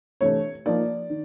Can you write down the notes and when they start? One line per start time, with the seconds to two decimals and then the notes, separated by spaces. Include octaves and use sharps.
0.21 C3 E3 A3 D4 C#5
0.66 F3 A#3 D#4 D5
1.10 D#3